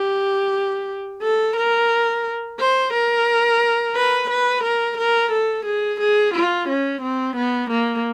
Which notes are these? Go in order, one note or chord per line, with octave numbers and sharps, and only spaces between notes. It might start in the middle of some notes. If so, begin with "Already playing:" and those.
Already playing: G4
A4
A#4
C5
A#4
B4
B4
A#4
A#4
A4
G#4
G#4
F4
C#4
C4
B3
A#3